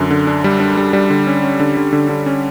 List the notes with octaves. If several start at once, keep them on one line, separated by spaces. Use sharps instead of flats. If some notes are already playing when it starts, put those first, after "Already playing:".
Already playing: F#2 D3
D3
D4
G3
D4
G3
G3
D3
C#4
C#4
D3
D3
D3
D3
C#4